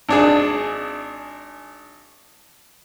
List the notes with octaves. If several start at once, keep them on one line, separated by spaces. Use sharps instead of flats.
G#1 D4 G#4